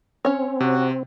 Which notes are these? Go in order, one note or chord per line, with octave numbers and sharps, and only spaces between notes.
C4 C#4 C#5
C3 F#4